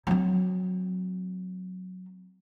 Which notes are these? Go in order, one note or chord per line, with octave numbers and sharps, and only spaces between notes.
F#3 C4